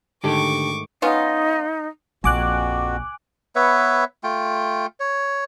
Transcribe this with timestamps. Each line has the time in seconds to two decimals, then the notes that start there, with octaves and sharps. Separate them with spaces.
0.24 G#2 D3 D#3 A3 G4 A4 C#6 D6
1.02 B3 C#4 D#4 F4
2.24 A#1 F2 F#4 G#5 D6 F#6
3.56 B3 B4 C#5 E5
4.23 A3 F4 G5
5.00 C#5